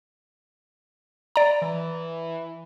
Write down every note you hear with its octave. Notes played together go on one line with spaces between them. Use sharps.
D5 A#5
E3